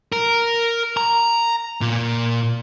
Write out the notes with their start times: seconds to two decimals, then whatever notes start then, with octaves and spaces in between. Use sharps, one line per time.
0.12 A#4
0.97 A#5
1.81 A#2